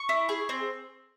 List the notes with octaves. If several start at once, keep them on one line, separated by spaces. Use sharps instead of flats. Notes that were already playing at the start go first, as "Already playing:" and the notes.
Already playing: C#6
E4
G#4
C4